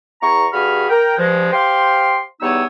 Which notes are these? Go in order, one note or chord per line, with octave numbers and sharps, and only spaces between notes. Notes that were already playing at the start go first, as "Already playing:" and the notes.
E2 A#5 C#6
G2 F#4 G#4 B5 F6
A#4 G5
G2 F3 G#3
G4 C5 F5 G5 C6
E2 G3 B3 D#4 C#5 E6